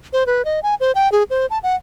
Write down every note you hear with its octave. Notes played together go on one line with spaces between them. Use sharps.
C5
B4
D#5
G#5
C5
G5
G#4
C5
A5
F#5